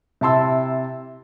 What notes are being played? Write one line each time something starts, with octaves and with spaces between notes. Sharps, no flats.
C3 E4 A5 C6 E6